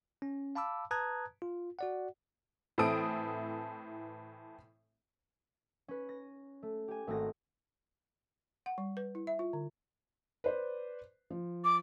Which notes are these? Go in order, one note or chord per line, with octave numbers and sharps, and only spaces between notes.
C#4
F5 A5 B5 D6 E6
B4 A5 A#5 D#6 F#6 G#6
F4
F#4 D5 F#5
A2 E3 C4 A4 D#6 D7
C#4 B4
A#6
A3
G4 G#5
G#1 A3 C4 D#4 F#4 A#6
F#5
G3
B4
E4
E5
F4
D3
B4 C5 D5
F3
D6